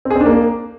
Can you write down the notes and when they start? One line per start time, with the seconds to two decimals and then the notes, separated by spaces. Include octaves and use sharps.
0.05 C4
0.10 G#4
0.16 C4
0.21 D4
0.26 A#3